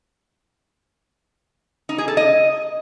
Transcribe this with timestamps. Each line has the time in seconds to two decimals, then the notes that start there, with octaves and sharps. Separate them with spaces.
1.89 D#4
1.98 G#4
2.08 A4
2.17 D#5